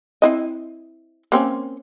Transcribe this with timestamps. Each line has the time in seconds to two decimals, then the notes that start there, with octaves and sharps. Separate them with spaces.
0.22 C4 E4 D#5
1.32 A#3 C4 C#4